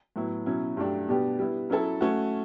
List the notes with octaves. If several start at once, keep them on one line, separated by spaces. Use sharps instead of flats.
A2 F#3 B3 E4
B2 F#3 C#4 E4
G2 F#3 A3 D4 G4
B2 G3 B3 D4 G4
G3 B3 E4
F#3 C#4 E4 A4
A3 C#4 F#4